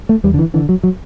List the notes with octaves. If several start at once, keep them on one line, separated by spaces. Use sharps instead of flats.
A3
E2 G3
D3
E3
D3 E3
F#3
F#3